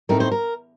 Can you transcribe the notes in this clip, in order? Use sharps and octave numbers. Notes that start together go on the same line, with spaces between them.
A2 A3 C4 D#4 A#4
C5
A#4